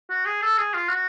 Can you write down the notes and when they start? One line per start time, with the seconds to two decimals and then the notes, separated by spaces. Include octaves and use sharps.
0.09 F#4
0.26 G#4
0.42 A4
0.58 G#4
0.74 F4
0.89 F#4